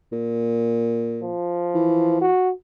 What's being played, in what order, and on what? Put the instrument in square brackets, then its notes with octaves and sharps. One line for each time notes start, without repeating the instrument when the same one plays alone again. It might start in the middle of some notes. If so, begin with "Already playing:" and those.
[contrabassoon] A#2
[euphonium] F3
[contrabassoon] E3
[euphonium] F#4